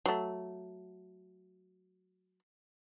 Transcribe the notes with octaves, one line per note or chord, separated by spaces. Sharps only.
F#3 A3